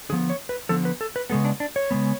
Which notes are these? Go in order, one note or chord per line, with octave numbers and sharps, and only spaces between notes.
D3 F3 B3 G#4
C#5
B4
D3 F3 B3 A4
B4
A4
B4
C#3 G#3 B3 A4
D4
D4
C#5
C#3 G#3 B3